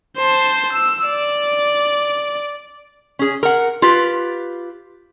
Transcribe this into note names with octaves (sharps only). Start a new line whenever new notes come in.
C5 A5
E6
D5
C#4 G#4
A#4 F#5
F4 G4 B4